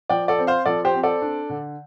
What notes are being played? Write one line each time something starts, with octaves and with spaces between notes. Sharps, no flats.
F3 D5 G5
A4 D5
C4
C5 F5
F3 A4 D5
G4 C5
C4
A4 D5
D4
D3